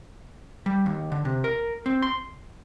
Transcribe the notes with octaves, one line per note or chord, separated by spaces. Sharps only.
G3
D#2
D3
C3
A#4
C4
C6